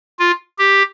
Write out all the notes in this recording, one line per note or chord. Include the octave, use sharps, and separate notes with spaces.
F4
G4